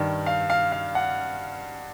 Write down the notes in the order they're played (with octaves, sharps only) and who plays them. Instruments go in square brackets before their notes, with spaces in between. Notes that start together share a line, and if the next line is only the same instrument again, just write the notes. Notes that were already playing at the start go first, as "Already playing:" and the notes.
Already playing: [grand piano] G2 D#3
F5
F5
F5
F#5